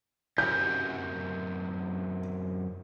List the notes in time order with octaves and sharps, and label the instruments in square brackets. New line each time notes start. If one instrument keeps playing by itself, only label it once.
[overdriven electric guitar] F#2 C3 [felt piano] G6